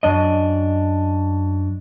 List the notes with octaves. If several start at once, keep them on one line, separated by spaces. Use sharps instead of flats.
F#2 D4 D#5